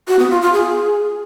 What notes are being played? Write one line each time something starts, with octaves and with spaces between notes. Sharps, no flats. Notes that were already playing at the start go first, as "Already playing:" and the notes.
F#4
B3
F4
F4
G#4